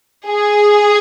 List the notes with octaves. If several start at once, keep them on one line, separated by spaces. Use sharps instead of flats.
G#4